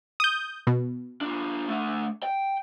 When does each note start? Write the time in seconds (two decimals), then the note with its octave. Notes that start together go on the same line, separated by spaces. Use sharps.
0.20 D#6 G6
0.67 B2
1.21 D4 F4
1.68 A3 D4
2.23 G5